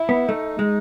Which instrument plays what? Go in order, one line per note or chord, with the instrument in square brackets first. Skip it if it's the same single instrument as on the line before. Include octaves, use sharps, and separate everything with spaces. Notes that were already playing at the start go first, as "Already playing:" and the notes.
Already playing: [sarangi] E4
[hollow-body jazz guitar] B3
[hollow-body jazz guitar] A3 [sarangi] D#4
[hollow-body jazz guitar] G#3